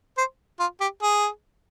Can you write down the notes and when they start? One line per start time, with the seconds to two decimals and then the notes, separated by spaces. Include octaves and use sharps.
0.17 C5
0.60 F4
0.81 G4
1.02 G#4